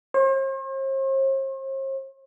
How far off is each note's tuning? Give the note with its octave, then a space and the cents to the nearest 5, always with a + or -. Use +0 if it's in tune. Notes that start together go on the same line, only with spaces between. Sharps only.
C5 +45